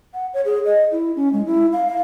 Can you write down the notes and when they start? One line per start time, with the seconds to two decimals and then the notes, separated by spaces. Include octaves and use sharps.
0.14 F#5
0.34 C#5
0.45 G#4
0.65 D#5
0.92 E4
1.16 C#4
1.33 G#3
1.46 E4
1.73 F5
1.88 F5